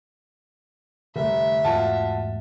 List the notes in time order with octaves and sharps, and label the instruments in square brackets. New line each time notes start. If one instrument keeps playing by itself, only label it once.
[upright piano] F1 [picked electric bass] D3 G3 A3 [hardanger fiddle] E5
[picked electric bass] E2 G#2 A3 [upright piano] F4 F#4 A5